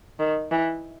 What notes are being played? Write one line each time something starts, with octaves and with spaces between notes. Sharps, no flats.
D#3
E3